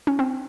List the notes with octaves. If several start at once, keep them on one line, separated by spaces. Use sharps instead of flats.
C#4
C4